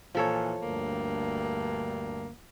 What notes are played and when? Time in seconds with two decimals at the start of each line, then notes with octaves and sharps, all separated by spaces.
0.15 A#2 E3 F3 A4 C#5
0.61 D2 G2 A#3